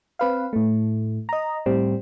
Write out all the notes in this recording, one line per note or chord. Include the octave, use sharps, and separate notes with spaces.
C4 B4 F5
A2 A3
D#5 A#5
A2 G3 C4